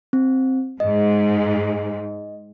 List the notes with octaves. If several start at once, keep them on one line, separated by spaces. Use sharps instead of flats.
C4
G#2 D#5